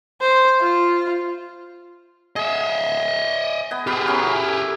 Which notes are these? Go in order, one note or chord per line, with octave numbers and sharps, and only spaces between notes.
C5
F4
G#4 D#5 E5
B3 G#5
B3 G4 G#4 F5 B5
C#4 E4 A#4
A4